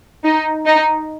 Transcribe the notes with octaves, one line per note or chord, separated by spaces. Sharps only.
D#4
D#4